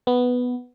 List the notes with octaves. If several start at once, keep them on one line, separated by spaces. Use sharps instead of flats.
B3